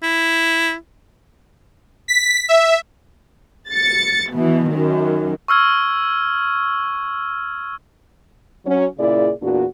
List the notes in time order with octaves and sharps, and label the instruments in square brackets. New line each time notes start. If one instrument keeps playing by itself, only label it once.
[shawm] E4
[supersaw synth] B6
E5
[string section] A6 C#7
B2 E3
F#2 D#3
[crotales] C#6 E6 F6 G#6
[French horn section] F#3 C#4
A#2 C#3 E4 G#4 D5
E2 A#2 D4 F#4